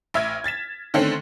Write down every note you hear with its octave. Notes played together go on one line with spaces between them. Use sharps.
A1 E5 F6 G#6
G#6 A6 B6 E7
D3 D#3 A3 C4 C#4